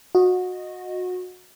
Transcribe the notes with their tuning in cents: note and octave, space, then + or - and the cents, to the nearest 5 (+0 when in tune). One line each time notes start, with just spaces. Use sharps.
F#4 -25 D#5 +0